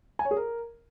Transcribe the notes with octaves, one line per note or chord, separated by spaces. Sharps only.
G#5
C#5
G#4
A#4